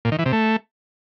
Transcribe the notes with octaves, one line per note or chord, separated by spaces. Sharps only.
A#2
D#3
E3
C3
A3